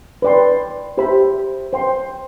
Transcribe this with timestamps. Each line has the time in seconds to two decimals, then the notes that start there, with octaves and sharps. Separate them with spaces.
0.22 B4 D5 G5 C6
0.98 G4 C5 E5 B5
1.73 C5 G5 C6